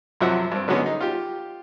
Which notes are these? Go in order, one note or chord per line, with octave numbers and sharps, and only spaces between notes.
F#2 C3 F3 F#3 E5 F#5
G2 C4
D3 F#3 G#3 B3 C#4 D#4
D#4
F4 G4